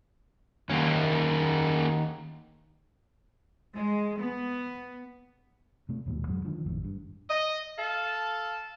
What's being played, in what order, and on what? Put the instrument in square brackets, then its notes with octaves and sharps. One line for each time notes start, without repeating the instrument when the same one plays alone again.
[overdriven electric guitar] D#2 [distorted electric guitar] A#3 C#4
[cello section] G#3
B3
[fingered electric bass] C3 A3
D#1 D#2 G#2 B2
F2 G#2 F#3 G#3
D3 D#3 F3 D4
G#1 F2 A2 D#3
G2
[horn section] D#5
A4 F5 A5